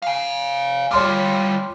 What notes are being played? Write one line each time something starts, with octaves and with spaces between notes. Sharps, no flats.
F5 G#5
G3 F4 C#5 C6 D6